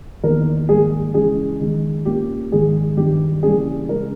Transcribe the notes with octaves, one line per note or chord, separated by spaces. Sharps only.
E2 D#3 A#3 D#4 A#4
G#2 D#3 G3 A#3 G#4
C#3 E3 G#3 G#4
D#3 G#3 D#4
A#2 A#3 C#4 G4
G#2 D#3 G#3 G#4
G2 D#3 G3 G4
C#3 E3 G3 A#3 G#4
C#3 G#3 C#4 A#4